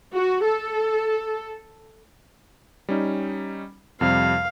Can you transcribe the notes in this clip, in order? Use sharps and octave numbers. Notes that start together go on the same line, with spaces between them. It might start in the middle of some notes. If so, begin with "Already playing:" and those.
F#4
A4
G3 C#4 D#4
F2 C3 G3 F5